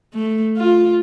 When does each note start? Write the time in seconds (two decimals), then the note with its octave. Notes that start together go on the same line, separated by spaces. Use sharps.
0.14 A3
0.57 F4